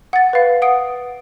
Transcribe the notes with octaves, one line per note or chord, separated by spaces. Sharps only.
F#5 A6
B4 F5
F#5 D#6 D7